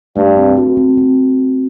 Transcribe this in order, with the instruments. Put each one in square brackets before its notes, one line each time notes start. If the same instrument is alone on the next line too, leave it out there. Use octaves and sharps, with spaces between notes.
[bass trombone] G2 [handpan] A3
[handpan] C4
F#4
C4
C4